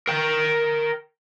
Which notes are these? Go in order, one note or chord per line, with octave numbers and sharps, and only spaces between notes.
A#4 G5